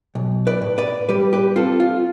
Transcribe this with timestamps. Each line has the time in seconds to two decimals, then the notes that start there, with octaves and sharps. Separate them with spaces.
0.15 B1
0.47 B4 D5
0.62 A2
0.78 B4 D5
1.09 G3 G4 B4
1.33 G4 B4
1.56 C4 F4 A4
1.80 F4